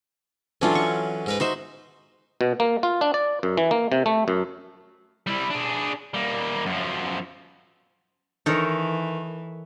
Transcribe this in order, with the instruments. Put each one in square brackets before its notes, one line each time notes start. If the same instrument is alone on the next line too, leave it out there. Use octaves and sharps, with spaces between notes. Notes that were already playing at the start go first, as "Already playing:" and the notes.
[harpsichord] D3 E3 F#3 [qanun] C#4 D4 F4
[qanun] C#6
[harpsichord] G#2 A#4 B4
[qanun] D#4 C5 E5 [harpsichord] F#4
[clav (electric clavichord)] B2
A#3
F4
D4
D5
F#2
E3
A#3
C3
A3
F#2
[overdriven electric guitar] G3 E4
D4 G#4
G3 A#3
F#2 F3
[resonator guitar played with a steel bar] D#3 [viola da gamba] E3 [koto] D#4 A#4 [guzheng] A4 C#5